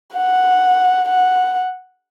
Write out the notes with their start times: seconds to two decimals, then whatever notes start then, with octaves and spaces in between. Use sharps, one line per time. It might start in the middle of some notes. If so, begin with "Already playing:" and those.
0.14 F#5
1.09 F#5